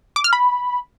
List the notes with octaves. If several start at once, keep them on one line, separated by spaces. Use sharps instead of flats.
D6
F6
B5